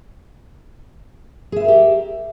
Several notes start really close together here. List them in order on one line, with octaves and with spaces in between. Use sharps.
G#4 E5 B4 A#4 G4